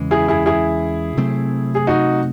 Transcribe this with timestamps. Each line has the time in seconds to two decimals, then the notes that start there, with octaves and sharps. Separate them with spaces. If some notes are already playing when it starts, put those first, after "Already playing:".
Already playing: E2 C#3 E3 G#3
0.11 E4 G#4
0.28 E4 G#4
0.46 E4 G#4
1.17 C3 F#3 A3 C4
1.75 G#4
1.87 D#4 F#4